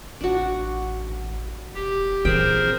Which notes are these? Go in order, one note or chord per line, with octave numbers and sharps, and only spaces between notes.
A1 D4 F#4
E1 G4
A#2 E3 C4 G#4 A#4 C5 G5